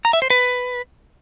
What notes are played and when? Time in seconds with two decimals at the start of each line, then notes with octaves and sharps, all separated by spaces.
0.05 A#5
0.13 E5
0.22 C5
0.30 B4